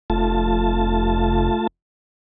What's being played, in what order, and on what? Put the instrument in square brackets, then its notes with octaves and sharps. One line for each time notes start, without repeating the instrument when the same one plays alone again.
[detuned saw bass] F1 [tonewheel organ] A3 F4 A5